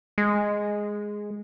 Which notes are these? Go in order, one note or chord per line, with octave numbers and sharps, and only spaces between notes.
G#3